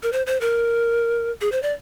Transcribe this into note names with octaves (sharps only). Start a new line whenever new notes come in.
A#4
C5
C5
A#4
G#4
C5
D5